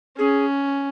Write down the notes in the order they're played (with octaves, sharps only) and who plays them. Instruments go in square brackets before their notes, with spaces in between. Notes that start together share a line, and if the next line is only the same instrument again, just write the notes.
[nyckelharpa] C#4 [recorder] G#4